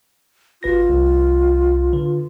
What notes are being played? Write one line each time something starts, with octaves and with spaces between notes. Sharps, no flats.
G#1 F4 B4 A#6
C2
D3 B4